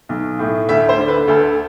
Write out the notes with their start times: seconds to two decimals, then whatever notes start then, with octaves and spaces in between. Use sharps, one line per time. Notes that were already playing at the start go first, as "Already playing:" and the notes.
0.09 B1
0.39 A2
0.69 D2 E5
0.89 C5
0.98 D3
1.08 B4
1.28 D2 A4